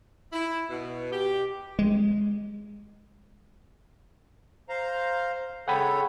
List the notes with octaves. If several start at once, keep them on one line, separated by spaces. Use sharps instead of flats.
E4
B2
G4
G#3
C5 F5 A#5
C#3 A4 C#5 F#5 G5 B5